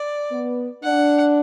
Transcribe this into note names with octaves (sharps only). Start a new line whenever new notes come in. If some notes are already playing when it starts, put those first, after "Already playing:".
Already playing: D5
B3
D4 F#5